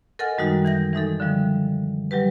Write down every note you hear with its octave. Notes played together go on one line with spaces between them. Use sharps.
A4 A#4 D#5 F#5 G#5 F6
F#2 D#3 G3 G#3 D#4 F#4
E3 G6 A#6
E3 G#3 D#4 A4
D3 F3 G3
F#3 G3 G4 B4